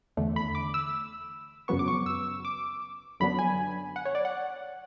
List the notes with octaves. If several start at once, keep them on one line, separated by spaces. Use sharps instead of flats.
E2 D3 A3
B5
D6
E6
F#2 C#3 F#3 B3 C#6
D6
C#6
E6
D6
F#2 D3 F#3 B3 D4 B5
G#5
F#5
C#5
D5
F#5